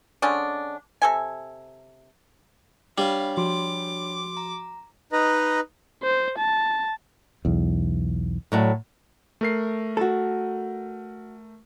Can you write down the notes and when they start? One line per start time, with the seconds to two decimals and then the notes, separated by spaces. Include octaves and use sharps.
0.22 D3 G#3 C#4 D4
1.02 C3 A4 G#5
2.98 G3 D4 C#5 F5 B5
3.37 F3 F#4 C6 D6
4.37 A#5
5.12 D#4 B4 D#5 A#5
6.03 C5
6.38 A5
7.45 B1 E2
8.52 A2 F#3 D5
9.41 A3 A#4 C7
9.97 F#4 A4